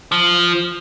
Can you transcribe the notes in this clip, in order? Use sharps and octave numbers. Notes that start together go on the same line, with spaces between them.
F3